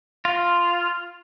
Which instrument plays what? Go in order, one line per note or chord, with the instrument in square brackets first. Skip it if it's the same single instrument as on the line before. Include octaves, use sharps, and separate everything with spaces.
[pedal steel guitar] F4